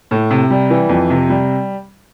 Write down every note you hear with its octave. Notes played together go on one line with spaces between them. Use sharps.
A2
C3
G3
E3
F2
C3
G3